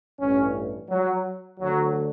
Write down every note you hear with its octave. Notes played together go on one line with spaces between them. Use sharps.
A1 G2 E3 C#4
F#3
D2 D3 F#3